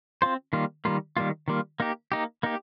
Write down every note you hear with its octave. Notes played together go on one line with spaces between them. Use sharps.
C4 F4 C5
D#3 G3 A#3 F4
D#3 G3 A#3 F4
D#3 G3 A#3 F4
D#3 G3 A#3 F4
A#3 D#4 G4
A#3 D#4 G4
A#3 D#4 G4